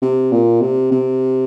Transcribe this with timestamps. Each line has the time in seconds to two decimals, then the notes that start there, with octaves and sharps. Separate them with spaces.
0.02 C3
0.32 A#2
0.61 C3
0.91 C3